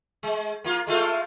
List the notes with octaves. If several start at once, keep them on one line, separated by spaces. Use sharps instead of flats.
G#3
A#3 F4
G#3 A3 F4